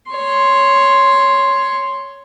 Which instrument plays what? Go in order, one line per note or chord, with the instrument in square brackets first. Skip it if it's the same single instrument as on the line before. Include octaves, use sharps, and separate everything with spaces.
[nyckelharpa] C#5 C6